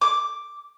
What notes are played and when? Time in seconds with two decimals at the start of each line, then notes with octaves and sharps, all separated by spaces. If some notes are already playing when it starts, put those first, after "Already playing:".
0.01 D6